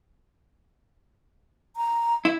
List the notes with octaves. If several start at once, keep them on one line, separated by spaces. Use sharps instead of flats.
A#5
E4